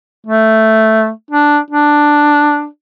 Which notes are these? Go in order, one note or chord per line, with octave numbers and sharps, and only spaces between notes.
A3
D4
D4